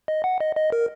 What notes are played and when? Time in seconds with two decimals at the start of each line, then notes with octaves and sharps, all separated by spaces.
0.08 D#5
0.24 F#5
0.40 D#5
0.56 D#5
0.72 A#4